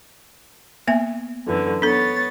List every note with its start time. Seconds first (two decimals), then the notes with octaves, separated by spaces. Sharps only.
0.88 A#3 B3 E5
1.47 F#2 D3 E3
1.82 B3 D4 A4 C#5 A6